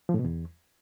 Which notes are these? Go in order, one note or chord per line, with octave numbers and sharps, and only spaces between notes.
F3
A2
B2
E2